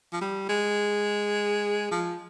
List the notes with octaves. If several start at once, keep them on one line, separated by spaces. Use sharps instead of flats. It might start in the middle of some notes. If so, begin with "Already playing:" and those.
F3
G3
G#3
F3